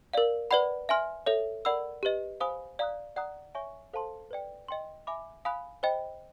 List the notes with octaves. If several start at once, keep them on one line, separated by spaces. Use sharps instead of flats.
A#4 D5 F5
B4 D5 F#5 B5
E5 G#5 C6 F6
A4 C#5 E5
A#4 D5 F#5 B5 E6
G4 B4 D#5
C5 F5 G#5 B5 D#6
D5 F5 A#5 D#6 F#6
D5 F#5 A#5 D#6 F#6
C#5 E5 G#5 C#6
A4 C5 F5 A5 C6
B4 D5 G5
D#5 G5 C6
E5 G#5 B5 D6
F5 G#5 B5 D#6 F#6
C5 D#5 G5 B5